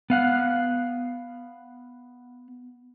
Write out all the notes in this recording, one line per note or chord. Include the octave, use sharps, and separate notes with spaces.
B3 F5 F#5